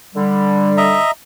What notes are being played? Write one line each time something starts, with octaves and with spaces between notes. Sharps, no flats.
D3 G3
D#5 E5 A#5